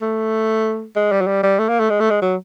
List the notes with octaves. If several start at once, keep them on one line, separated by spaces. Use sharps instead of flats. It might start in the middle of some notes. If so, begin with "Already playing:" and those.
A3
G#3
G3
F#3
G3
G3
A3
A#3
A3
G#3
A3
G#3
F#3